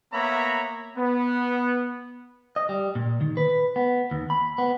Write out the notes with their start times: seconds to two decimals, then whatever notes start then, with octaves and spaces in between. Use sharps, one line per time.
0.13 A#3 B3 C#5 E5 A#5 B5
0.97 B3
2.56 D#5
2.69 G3
2.95 A#2
3.21 D#3
3.37 B4
3.76 B3
4.11 D#2
4.30 B5
4.58 B3